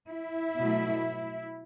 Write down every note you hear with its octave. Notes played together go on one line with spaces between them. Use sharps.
E4
B2 F#3 A3